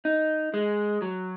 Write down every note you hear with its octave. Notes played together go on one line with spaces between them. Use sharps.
D#4
G#3
F#3